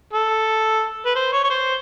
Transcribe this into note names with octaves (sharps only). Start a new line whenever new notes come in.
A4
B4
C5
C#5
C#5
C5